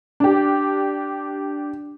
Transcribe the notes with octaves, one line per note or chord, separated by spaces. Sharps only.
D4 G4